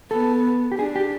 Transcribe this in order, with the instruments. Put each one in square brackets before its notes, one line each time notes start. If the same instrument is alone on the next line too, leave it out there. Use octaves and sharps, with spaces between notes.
[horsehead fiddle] B3 [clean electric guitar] A4
[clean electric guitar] G4
[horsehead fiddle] D4 [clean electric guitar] G#4
[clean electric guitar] G4